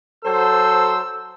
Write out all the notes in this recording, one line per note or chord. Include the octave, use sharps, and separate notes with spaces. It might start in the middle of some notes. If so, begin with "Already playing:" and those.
F#3 A4 C5 E6